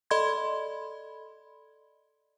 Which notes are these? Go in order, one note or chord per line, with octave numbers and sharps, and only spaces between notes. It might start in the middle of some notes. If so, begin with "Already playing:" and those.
A4 D5 D#5 B5 C6 G#6